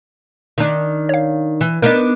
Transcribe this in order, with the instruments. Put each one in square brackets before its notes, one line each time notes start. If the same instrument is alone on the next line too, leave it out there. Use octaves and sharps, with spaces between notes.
[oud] D#3 D4
[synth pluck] C#5 F5
[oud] E3
[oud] B3 D4 D#4 [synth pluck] A#4 D#5